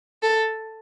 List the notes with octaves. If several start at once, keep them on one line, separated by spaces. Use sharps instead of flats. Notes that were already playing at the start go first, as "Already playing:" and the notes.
A4